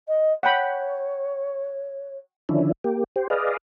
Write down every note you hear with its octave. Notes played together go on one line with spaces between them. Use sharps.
D#5
C#5 F#5 G5 B5
D3 D#3 F3 C#4 D4 E4
A#3 G4
G4 C5
G#4 B4 D5 D#5 F5